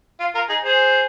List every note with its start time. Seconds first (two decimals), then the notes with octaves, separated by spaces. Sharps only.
0.20 F4
0.34 F4 A#4
0.49 D#4 G#4
0.64 G#4 C5